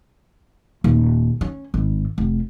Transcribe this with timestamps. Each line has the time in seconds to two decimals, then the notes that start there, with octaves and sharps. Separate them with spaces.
0.84 D#1
1.41 C#4
1.74 G#1
2.18 F1